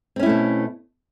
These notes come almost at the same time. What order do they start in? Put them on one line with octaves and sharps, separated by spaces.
C4 C#4 E4 A3 B2